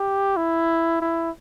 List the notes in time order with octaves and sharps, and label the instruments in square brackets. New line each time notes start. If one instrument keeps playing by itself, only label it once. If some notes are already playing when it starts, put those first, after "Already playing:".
Already playing: [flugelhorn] G4
E4
E4